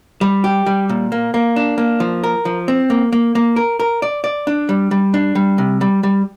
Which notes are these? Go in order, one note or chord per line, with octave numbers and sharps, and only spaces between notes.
G3
G4
G3
A#2
A#3
A#3
D4
A#3
F3
A#4
F3
C4
A#3
A#3
A#3
A#4
A#4
D5
D5
D4
G3
G3
D4
G3
C3
G3
G3